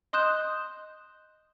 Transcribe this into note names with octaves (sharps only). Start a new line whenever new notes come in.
D#5 C6 D#6 F#6 G6 E7